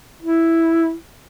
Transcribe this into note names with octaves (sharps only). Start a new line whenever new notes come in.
E4